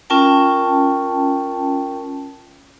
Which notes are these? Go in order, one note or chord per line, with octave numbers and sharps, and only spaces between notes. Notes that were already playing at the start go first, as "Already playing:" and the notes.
C#4 F4 A#4 G5 A5